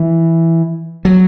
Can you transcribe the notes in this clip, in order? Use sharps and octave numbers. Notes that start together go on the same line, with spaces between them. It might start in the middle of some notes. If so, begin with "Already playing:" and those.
Already playing: E3
F#3